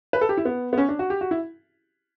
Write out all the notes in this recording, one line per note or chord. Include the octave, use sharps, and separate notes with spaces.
B4
A4
G4
E4
B3
B3
C#4
D4
F#4
G4
F#4
E4